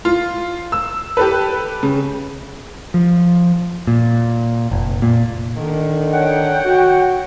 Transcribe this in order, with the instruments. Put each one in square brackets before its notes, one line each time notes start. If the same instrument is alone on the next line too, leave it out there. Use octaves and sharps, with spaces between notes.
[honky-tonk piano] F4
E6
G4 A4 B4
C#3
[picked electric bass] F3
A#2
F1
A#2
[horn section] D3 D#3
[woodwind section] C#5 F#5 G5
[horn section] F#4